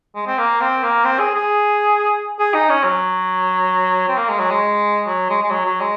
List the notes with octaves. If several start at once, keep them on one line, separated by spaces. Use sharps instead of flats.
G#3
C4
A#3
C4
A#3
C4
G#4
G#4
G#4
D#4
C#4
F#3
C4
A#3
G#3
F#3
G#3
F#3
G#3
G#3
F#3
F#3
G#3